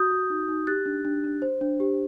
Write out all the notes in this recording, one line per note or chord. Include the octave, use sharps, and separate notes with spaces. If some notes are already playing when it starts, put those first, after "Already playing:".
Already playing: F#4 D#6 G6
F#4
D#4
D#4
G4 F#6 A6
D4
D4
D4
C5
D4
G4